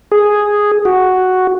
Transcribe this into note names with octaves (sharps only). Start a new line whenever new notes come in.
G#4
F#4